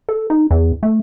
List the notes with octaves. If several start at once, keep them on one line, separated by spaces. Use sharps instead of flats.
A4
D#4
E2
A3